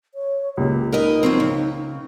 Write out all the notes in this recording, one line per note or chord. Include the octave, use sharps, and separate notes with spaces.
C#5
C#2 A#2 G4
D#4 A#4 B4 D#5
F3 F#3 C4
C#3